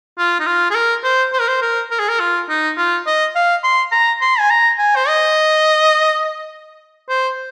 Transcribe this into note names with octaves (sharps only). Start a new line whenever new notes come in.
F4
D#4
F4
G#4
A#4
C5
C5
A#4
C5
A#4
A#4
G#4
A#4
F4
D#4
F4
D#5
F5
C6
A#5
C6
G#5
A#5
G#5
C5
D#5
C5